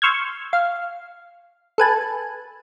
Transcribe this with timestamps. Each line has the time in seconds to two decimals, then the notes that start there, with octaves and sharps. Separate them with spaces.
0.02 C6 C#6 E6 F6 G6 G#6
0.53 F5
1.78 A4 B4 G#5 A5